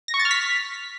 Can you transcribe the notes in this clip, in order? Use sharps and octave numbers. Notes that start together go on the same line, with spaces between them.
A#6
C#6
A6
F6
B6